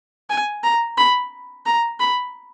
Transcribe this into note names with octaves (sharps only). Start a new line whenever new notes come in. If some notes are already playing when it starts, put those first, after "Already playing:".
G#5
A#5
B5
A#5
B5